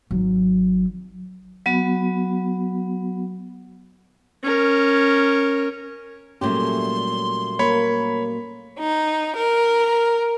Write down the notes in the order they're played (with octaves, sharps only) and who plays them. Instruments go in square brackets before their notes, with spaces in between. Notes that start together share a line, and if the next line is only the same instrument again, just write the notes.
[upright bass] G#1 F#3
[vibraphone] F#3 B3 F#4 B5
[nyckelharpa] C#4 A#4
[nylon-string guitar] A#2 F#3 G4 [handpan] G3 A3 C#4 [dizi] C6
[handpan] A#3 A#4 [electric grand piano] C#5 B5
[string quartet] D#4
A#4